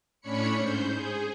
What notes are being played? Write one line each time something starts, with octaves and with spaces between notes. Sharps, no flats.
A2 C#4 D4 C#5 B5 C#7
G#2 C5 G6
G#4